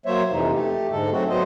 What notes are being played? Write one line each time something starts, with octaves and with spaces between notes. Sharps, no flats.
F#3 A#3 C5 C#5 E5
F2 C3 E3 D#4
A3 G4
G#2 D3 G#3 A4
F#3 A3 C4 F#4
F#3 A3 B3 C5 D#5